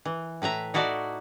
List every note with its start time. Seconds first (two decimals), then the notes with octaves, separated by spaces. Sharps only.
0.05 E3
0.42 A2 B4 E5 A#5
0.74 D#4 E4 F#4 A4 D5